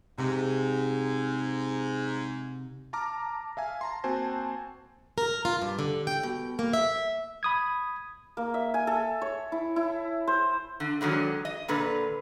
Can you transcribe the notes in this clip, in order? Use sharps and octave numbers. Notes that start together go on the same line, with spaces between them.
G#2 C3
A5 A#5 D6 F6
E5 F5 G#5
A5 A#5 C6
A#3 C4 F#4 C5 G#5 A5
A#4
F4
G2
D3
G5
B2
A#3
E5
B5 D#6 G#6
A#3
E5
G#5
A4
C#5
E4
E4
C5
D3
G#2 D3 D#3 F#3
D#5
A#2 D3 B4